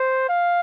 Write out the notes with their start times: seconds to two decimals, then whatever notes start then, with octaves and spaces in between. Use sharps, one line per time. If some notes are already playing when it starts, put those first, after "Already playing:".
Already playing: C5
0.29 F5